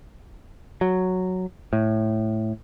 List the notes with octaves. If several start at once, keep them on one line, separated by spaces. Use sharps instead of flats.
F#3
A2